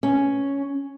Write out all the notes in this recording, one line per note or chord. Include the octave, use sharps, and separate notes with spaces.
C#4